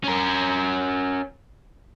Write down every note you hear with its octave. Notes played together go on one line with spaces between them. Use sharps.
C#4 A#4